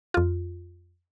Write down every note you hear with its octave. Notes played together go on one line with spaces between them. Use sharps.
F2 F4